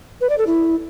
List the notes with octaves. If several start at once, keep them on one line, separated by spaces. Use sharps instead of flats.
B4
D5
A4
E4